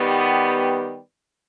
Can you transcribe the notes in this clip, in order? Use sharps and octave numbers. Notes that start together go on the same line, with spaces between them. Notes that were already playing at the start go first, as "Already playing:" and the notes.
Already playing: D#3 G3 B3 G4